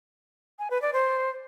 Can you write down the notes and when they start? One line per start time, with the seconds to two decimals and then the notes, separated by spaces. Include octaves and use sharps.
0.59 G#5
0.70 B4
0.82 D5
0.93 C5